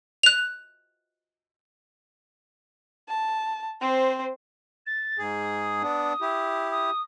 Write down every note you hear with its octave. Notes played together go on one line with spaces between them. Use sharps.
F#6 F7
A5
C4 C5
A6
G#2 G#4
D#6
B3 D4
E4 G4
D#6